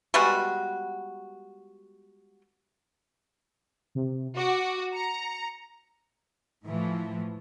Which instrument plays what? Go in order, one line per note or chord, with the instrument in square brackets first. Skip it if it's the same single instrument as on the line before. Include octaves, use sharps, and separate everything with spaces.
[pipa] G3 G#3 B3 F#4
[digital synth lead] C3
[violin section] F#4 [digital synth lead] D6
[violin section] A#5 [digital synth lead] C#7
[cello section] A2 E3 F3